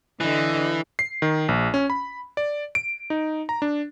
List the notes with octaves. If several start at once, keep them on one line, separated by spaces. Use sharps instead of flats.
D3 E3 D#5
C7
D#3
A#1
C#4
B5
D5
D7
D#4
A#5
D4